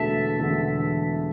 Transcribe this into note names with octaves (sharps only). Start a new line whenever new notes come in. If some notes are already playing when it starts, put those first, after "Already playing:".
Already playing: E1 E2 D3 A3 E5 A5
E1 E2 D3 A3